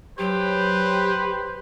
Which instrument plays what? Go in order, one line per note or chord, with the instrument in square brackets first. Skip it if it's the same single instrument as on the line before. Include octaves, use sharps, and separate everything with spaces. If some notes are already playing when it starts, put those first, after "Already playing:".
[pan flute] F#3 [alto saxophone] G4 [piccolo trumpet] B4 [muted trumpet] C5